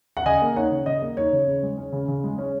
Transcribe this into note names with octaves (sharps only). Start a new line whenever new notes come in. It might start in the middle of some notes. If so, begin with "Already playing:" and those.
F#5
C#3 D#5 G#5
A#3
D#4 C#5 F#5
C#3
C#3 D#5
A#3
D#4 C#5
C#3
C#3
G#3
C#4
C#3
C#3
G#3
C#4